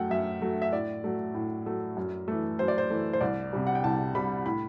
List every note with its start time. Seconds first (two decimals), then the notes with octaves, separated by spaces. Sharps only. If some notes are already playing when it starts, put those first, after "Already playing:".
Already playing: F#2 F#3 A3 F#5 G5
0.10 F#2 E5
0.42 F#3 A3
0.62 E5
0.73 A2 D5
1.04 F#3 A3
1.34 A2
1.66 F#3 A3
1.97 F#2
2.28 E3 A3
2.59 F#2 C5
2.68 D5
2.78 C5
2.90 E3 A3
3.13 C5
3.21 C2 D5
3.53 C3 G3
3.67 F#5
3.75 G5
3.84 C2 A5
4.14 C3 G3 B5
4.46 A2 B5